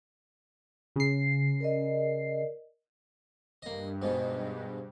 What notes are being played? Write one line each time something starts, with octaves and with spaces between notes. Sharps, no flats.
C#3 C7
A#4 D5 D#5
G2 A#3 D#5
G#2 B2